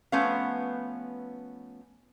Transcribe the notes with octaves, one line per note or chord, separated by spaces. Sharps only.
F3 A3 B3 C#4 B4 F5